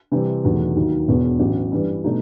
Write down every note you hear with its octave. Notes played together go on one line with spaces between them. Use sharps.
C3 E3 G3 C4
E1 E2 D#3 F#3 A3
D#2 D#3 F#3
E1 E2 B2
A1 G2 F#3
G2 E3 G3
B2 F#3 A3 D#4